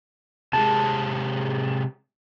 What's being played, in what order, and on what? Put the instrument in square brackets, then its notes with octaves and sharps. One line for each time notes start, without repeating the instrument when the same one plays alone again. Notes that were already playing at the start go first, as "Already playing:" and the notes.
[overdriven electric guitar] C3 G#3 [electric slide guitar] A5